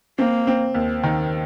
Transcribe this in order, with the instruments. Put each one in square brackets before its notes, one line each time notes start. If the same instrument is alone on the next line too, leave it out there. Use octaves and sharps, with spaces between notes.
[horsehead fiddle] A#3 [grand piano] C4
[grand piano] C4
D#2
D#3